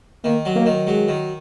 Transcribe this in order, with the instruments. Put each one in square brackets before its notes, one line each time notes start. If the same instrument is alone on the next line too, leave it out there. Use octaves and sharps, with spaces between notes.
[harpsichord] D#3 [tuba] A#3
[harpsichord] F#3
[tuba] A#3
[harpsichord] D#3
[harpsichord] F#3 [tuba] G#3
[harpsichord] D#3